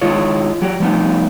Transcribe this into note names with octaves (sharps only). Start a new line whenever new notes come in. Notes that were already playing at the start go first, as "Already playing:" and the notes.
D#3 G#3 E4 F4 C#5
F#3 F#4 G4
F3 G3 A3 B3 D#4